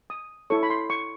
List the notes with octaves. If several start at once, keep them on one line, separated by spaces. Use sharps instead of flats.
D#6
E4 A4 C#5 C#6
B5
C6
C#6